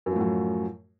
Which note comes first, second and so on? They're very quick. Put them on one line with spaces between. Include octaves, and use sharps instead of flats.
F#2 F3 A2 F#3